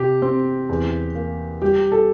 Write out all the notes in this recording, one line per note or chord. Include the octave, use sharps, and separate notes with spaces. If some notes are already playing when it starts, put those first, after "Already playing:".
Already playing: C3 G4
C4
E2
A#3
G3 G4
A4